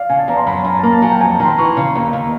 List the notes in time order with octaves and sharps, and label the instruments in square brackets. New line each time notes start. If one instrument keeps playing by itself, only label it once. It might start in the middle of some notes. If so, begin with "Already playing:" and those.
Already playing: [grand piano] D5 F5
[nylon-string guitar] C#3 [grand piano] G#5
[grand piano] A5
[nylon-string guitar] E2 [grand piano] A#5
[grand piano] C6
[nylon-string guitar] F#2 [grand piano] B5
[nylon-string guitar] F#2 [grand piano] A#5
[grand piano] A5
[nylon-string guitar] A#3 [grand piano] A#5
[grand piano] A5
[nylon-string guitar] F#3 [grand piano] G#5
[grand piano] G5
[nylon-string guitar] F2 [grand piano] G#5
[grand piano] A5
[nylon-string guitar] D#3 [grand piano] A#5 C6
[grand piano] B5
[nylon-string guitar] E3 [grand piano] C#6
[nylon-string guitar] C#3
D#2
D#2